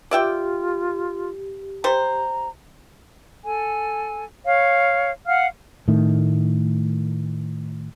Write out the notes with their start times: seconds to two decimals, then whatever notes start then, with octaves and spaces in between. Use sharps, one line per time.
0.11 F4 G4 D5 E5 G5
1.84 G3 C5 A#5
3.43 A4 G#5
4.46 C#5 F5
5.26 F5 F#5 F6
5.88 A2 D#3 A3